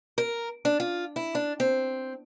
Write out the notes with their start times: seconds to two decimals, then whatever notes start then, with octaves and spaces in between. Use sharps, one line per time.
0.18 A#4
0.65 D4
0.80 F4
1.16 E4
1.35 D4
1.60 C4